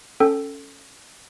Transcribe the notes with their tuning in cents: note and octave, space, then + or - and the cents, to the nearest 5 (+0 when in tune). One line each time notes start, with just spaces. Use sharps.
C#4 +0 A4 +10 G5 -25